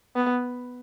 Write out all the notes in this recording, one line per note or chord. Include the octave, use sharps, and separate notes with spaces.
B3